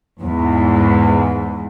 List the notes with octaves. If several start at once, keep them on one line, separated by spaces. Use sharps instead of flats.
E2 G#2